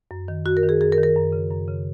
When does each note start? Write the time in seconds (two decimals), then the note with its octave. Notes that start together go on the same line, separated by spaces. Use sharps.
0.11 F#2
0.28 D#3
0.46 F#2 F#4
0.57 A#4
0.63 D#3
0.69 G#4
0.81 F#2 G#4
0.92 A#4
0.98 D#3
1.03 A#4
1.16 F#2
1.32 C#3
1.51 F#2
1.68 C#3